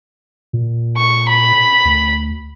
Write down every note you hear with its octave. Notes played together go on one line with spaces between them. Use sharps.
A#2
C#6
B5
D2